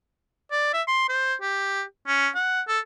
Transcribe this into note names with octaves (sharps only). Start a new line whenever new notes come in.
D5
E5
C6
C5
G4
C#4
F#5
A4